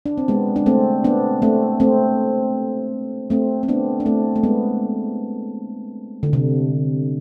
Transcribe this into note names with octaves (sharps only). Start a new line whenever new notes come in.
D4
C4
G#3 B3
D4
A3 C4
B3 D4
A3 C4
A3 C4
A3 C4
C4
B3 D4
D4
A3 C4
A3
G#3 B3
D3
C3